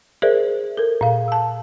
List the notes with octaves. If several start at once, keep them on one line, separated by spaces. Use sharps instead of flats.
G#4 A#4 C5 D5 E5
A4 A#4
A#2 F5
A5 E6